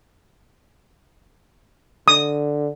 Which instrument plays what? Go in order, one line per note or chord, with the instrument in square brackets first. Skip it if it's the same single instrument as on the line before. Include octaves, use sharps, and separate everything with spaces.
[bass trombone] D3 [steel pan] D#6